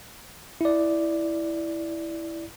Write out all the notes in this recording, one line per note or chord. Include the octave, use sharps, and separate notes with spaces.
E4 D5